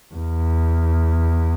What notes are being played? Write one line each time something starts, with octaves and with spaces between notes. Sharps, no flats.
E2